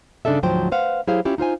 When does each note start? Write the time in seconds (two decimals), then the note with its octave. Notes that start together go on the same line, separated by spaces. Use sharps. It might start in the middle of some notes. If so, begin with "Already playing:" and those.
0.25 G2 C#3 D4 D#4 A4 E5
0.43 D2 G#2 F3 F#3 C5 G5
0.72 B4 C5 F5 F#5
1.07 F#3 E4 G4 G#4 C5 F5
1.25 C#4 E4 F4 G4
1.38 D#4 F4 C5 G#5